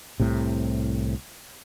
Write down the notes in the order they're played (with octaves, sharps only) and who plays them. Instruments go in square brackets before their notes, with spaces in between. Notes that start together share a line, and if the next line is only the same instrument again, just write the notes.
[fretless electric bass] C2 A2 C3